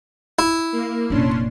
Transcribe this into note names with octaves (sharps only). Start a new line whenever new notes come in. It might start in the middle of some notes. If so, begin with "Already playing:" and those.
E4
A#3
F1 A#2 C#4 D4 C6